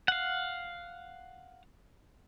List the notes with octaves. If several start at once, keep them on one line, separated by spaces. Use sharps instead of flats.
F5 F#5